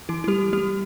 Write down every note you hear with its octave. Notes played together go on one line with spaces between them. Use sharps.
E3 E4
E4
G3 G4
G3 G4